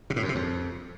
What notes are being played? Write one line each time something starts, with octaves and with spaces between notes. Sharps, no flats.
C3
A2
F#2
C3
F2